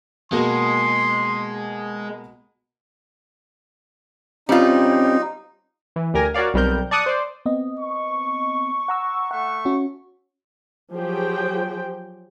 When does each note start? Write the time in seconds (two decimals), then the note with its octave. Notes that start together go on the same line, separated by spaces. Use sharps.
0.32 B2 G#3 A#3 F#4 C6
4.49 G3 C4 C#4 D#4 F4 G4
5.96 E3
6.14 D2 G4 A#4 G#5 A#6
6.34 F#4 A#4 C#5 D5 F5
6.54 B1 G3 C4 A#4 G6
6.91 D5 A5 C#6 D#6 F#6
7.06 C5 D5
7.45 B3 C4 D#5
7.79 C#6
8.88 F#5 A#5 E6
9.31 A3 E5 F#5 C#6
9.65 C#4 F#4
10.93 F3 F#3 G4 G#4 C5 G5